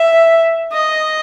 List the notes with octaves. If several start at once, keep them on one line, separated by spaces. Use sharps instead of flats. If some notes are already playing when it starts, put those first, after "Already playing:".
Already playing: E5
D#5